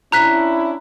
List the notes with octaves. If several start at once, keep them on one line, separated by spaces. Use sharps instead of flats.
C#4 D4 E4 A#5 F#6 B6